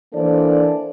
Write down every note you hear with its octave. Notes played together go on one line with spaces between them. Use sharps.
E3 A#3 D4 A4 C5 D5